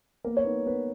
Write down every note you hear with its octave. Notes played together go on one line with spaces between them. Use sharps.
A#3 B3 A#4
C#5
B3 D#4 B4
B3 B4